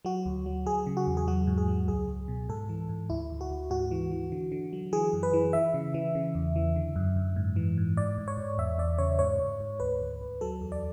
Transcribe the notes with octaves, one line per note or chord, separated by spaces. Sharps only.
F#3 F#4
D2
F#3
F#3 G#4
C#3
F#4
E2
G#4
F#3 F#4
G#2
G#4
F#3
C#2 G#4
C#2
B2
G#2 A4
E3
G#2
D2 E4
D2
F#4
D2
G#2 F#4
E3
E3
D3
D3
F#3
E3 G#4
F#2
B4
E3
E3 E5
C#3
E3
C#3
E2
E3
D3
F#2
F#2
G#2
E3
G#2
G#2 D5
G#2
C#5
G#2
E2 E5
E2 D5
C#3 C#5
G#2 C#5
G#2
G#2
D2 B4
D2
D2
F#3 A4
E2
D5